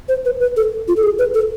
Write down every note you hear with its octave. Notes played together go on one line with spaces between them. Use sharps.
C5
B4
B4
A4
F4
A4
G#4
B4
A4